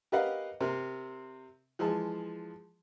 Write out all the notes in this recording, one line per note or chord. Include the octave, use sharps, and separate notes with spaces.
G4 A#4 B4 D#5 F5 F#5
C3 C4 A#4
E3 F3 G#3 G#4 A5